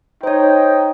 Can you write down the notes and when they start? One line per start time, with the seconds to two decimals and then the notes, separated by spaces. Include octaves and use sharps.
0.23 D#4 C5 C#5 G5